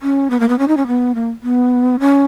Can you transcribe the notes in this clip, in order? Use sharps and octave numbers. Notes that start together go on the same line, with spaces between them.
C#4
B3
A#3
B3
C#4
D#4
C#4
B3
A#3
B3
C#4